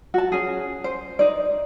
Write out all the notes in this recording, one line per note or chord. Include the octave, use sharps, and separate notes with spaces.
F#4 A5
C#4 G#4
C5
D#4 D5